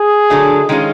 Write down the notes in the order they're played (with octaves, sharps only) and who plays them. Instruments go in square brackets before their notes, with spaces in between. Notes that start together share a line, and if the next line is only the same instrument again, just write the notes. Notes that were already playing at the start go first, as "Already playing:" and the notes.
Already playing: [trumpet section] G#4
[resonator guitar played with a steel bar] D3 F#3 A3 D4
D#3 G#3 C#4 F4